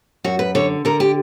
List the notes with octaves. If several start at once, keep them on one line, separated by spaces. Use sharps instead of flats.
F#2 F#4
B4
D3 C#5
D3 A#4
G4